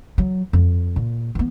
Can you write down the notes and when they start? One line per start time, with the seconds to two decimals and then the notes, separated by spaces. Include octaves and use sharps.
0.18 F#3
0.53 F2
0.96 A#2
1.35 E3 B3